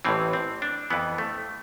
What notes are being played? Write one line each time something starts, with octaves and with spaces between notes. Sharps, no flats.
A1 A2 E3 C4
C4
D4
F2 E3 B3
A3